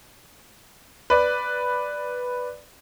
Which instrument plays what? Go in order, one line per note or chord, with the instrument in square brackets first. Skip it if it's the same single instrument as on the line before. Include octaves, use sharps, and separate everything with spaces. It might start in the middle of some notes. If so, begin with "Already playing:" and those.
[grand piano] B4 D5